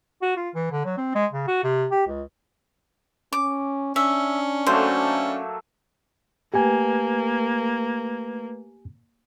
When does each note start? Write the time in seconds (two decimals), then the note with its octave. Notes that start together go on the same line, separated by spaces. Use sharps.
0.22 F#4
0.37 F4
0.55 E3
0.72 D3
0.85 F#3
0.97 C4
1.15 G#3
1.33 C#3
1.47 F#4
1.64 C3
1.91 G4
2.07 C#2
3.33 C#4 D6
3.96 C#4 D4 E5
4.67 F#3 A3 A#3 C5
6.54 A3 A#3 G4 B4 G#5